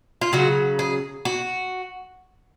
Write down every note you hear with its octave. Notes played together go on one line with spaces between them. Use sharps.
F4
C#3 F#3 F#4
G#4
F#4